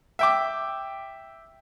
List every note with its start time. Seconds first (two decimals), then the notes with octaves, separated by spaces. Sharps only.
0.19 E5 G5 D6